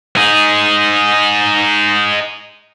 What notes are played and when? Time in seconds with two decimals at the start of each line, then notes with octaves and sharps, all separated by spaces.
0.17 D#4 G#4